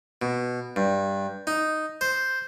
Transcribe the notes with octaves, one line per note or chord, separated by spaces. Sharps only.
B2
G2
D#4
C5